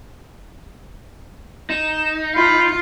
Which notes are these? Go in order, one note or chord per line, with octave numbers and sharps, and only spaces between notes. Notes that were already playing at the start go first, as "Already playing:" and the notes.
D#4 E7
F4 B5